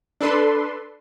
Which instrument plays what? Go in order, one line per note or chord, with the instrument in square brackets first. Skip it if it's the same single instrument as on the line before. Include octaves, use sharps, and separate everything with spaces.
[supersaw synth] D4 A4 B4 C6